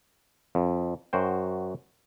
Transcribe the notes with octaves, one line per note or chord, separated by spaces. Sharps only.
F2
F#2 F#4 C5 G5